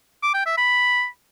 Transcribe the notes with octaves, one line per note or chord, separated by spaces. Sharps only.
D6
G5
E5
B5